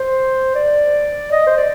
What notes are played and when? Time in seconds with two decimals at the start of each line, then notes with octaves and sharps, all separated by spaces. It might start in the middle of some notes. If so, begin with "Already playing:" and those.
Already playing: C5
0.55 D5
1.32 D#5
1.47 C5
1.57 D5